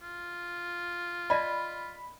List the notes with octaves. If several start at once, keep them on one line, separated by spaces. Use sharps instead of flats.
F4
D5 D#5 A5 B5